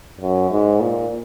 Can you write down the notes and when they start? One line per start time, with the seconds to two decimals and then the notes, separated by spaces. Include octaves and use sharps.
0.20 F#2
0.51 G#2
0.80 A#2